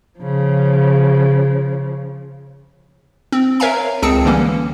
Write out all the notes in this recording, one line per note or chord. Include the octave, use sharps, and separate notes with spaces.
C#3 F3
C4
A#4 C#5 E5 F5 G#5 A#5
C#2 C4 G#4 G5 A5 C#7
D3 E3 G3 A#3 C#4